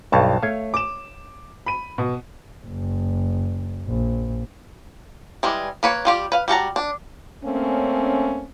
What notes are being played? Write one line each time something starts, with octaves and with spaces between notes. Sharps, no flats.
B1 G2 F5 A5 C#6
A3 C#5 F5
D6 E7
B5 D#7
B2
F#1
A#1
E3 G3 G#3
A#3 B4 C#5
G3 F4 G4
B4 F5
G3 F#4 A5 A#5
D4
A3 A#3 C4 C#4